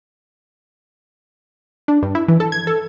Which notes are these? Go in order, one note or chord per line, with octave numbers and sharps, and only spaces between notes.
D4
G2
E4
E3
A4
G#6
A4